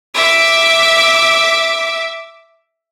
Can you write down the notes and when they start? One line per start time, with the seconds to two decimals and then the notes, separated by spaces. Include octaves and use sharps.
0.14 E5 D6